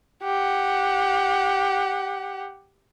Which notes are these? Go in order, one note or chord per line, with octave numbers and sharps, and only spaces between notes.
G4 F#5